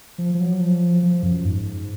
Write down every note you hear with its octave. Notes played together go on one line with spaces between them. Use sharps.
F3
F3
F#3
F3
F3
F#2
G#2